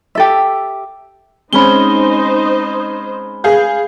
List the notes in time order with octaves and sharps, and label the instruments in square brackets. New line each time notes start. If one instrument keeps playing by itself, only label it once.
[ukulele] G4 A4 E5
[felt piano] G#3 C4 C#4 [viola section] D#4 C5 D#5 [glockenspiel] B5 G7
[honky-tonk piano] G#4 F5 G6